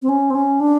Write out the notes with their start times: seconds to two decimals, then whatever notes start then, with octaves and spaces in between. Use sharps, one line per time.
0.02 C4
0.09 C#4
0.30 C4
0.35 C#4
0.60 D4